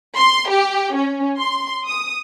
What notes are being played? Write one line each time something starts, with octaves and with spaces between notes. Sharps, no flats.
C6
G4
C#4
C6
D#6